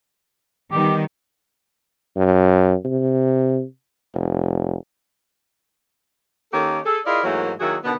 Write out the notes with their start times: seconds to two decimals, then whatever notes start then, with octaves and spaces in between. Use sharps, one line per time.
0.72 D#3 G3 B3 G4
2.17 F#2
2.85 C3
4.15 F1
6.53 D#3 A#3 C#4 G4 A4
6.85 G#4 A4
7.06 E4 F4 G#4 A#4 D5 D#5
7.24 G#2 E3 F#3 A3 A#3
7.60 D#3 F#3 A#3 E4 F#4 G#4
7.84 B2 D3 D#3 B3